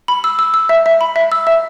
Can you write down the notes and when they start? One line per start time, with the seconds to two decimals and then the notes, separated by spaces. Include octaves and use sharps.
0.08 B5
0.24 E6
0.39 E6
0.54 E6
0.69 E5
0.86 E5
1.01 B5
1.16 E5
1.32 E6
1.47 E5